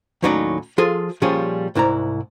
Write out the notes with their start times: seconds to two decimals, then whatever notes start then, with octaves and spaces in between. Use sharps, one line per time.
0.23 D#2 A2 F#3 C#4 D#4 D5
0.78 F3 F4 G#4 A4
1.22 A#2 F3 G3 C#4 G#4
1.75 C2 G#2 E4 D5 A#5